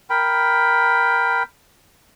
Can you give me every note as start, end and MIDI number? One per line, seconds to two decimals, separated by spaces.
0.10 1.43 70
0.10 1.43 79
0.10 1.43 83